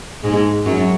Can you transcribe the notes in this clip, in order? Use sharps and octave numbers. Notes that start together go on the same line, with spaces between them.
G#2 G#3
F#2 F#3